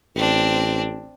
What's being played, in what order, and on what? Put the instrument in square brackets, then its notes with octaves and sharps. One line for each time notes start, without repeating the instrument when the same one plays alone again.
[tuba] A1 [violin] C4 D4